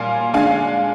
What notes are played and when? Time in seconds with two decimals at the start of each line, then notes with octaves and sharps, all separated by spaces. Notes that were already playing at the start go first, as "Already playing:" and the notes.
Already playing: A#2 G3 F5 G#5
0.33 D3 G#3 D4 F5 G#5